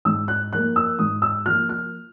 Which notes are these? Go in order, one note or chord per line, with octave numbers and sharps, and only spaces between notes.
G#2 E6
F#6
F3 A#3 F#6
E6
G#2 D#6
E6
F3 A#3 F6
F6